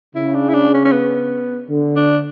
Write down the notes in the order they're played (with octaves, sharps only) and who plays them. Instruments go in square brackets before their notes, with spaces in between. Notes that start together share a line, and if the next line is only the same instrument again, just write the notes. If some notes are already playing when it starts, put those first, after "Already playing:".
[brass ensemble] C#3 [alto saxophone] E4
[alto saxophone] D4
E4
D4
C#4
C#4
B3
[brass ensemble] D3
[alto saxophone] D4